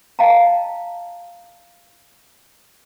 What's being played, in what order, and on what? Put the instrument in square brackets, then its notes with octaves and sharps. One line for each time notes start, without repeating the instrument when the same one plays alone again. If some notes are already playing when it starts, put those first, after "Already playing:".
[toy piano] D#5 F5 G5 A5 A#5